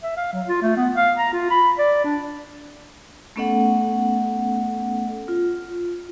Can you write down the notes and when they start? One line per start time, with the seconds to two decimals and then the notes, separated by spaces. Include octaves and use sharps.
0.03 E5
0.17 F5
0.33 F#3
0.47 F4
0.62 A3
0.77 B3
0.96 F5
1.17 A#5
1.33 F4
1.50 B5
1.78 D5
2.04 D4
3.36 A3 B3 C#4 A4 D#5 F#5
5.28 F4